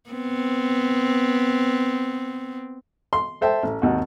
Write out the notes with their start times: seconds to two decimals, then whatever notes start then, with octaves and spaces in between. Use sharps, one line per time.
0.10 B3 C4
3.13 C6
3.41 A4 C5 E5 G5 A5
3.63 A1
3.82 G#1 D#2 F#4